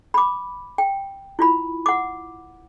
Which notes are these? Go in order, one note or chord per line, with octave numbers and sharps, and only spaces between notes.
B5 D6
G5
E4 F4 B5
F#5 D6